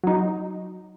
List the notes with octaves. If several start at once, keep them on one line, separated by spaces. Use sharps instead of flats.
F#3 D#4